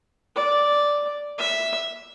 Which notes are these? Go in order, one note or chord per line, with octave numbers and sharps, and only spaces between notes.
D5
E5